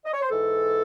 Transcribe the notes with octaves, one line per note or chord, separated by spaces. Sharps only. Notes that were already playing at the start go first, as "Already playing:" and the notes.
D#5
C#5
C5
G#2 E3 A4